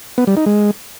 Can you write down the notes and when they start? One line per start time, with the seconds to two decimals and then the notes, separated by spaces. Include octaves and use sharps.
0.18 B3
0.27 G3
0.37 D#4
0.46 G#3